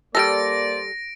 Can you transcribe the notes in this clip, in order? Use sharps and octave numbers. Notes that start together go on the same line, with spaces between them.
G3 A#3 A4 C5 D5 A#6 D7